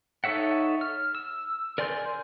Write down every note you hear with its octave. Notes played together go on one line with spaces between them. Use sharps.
D#4 A4 C#5 E5 F#5
F6
E6
A#4 D5 G#5 C6 G6